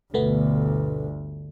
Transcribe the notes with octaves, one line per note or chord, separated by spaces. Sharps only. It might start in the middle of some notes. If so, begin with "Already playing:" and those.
G1 D2 B2 A3 B3